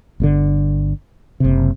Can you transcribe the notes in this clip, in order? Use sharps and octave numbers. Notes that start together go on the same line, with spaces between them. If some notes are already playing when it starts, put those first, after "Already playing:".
G1 A#2 D3
F#1 C3